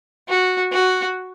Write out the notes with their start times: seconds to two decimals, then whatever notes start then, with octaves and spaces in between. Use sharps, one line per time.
0.28 F#4
0.72 F#4